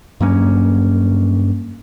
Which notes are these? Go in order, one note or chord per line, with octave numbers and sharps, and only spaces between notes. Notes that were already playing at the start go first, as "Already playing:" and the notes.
G2 F#3 A#3 C#4